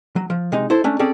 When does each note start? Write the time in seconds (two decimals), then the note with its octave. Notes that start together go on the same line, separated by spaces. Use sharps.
0.16 F#3
0.30 F3
0.52 C3 G#3 D#4
0.70 E4 A4 C5
0.84 A3 C#4 D4
0.99 C4 C#4 G#4 A4 D5